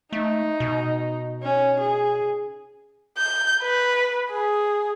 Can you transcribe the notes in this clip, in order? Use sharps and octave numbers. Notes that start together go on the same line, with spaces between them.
A3 D#4
B2
C#4
G#4
G6
B4
G#4